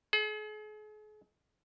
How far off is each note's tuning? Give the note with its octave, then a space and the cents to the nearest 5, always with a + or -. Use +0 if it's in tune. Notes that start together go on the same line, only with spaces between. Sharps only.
G#4 +40